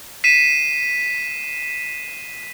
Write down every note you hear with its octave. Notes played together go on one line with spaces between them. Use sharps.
B6 C7 D#7 E7